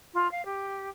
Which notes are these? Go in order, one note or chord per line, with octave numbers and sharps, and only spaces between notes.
F4
F5
G4